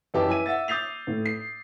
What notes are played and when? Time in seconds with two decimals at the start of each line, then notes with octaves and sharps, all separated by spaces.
0.14 F#2 E3 G4 D#5 A5 D6
0.27 E3 E4 E5 G#5 B6 D#7
0.46 E5 F#5 E6 A6
0.68 D6 D#6 G6 A6 C7 F7
1.07 A2
1.25 C7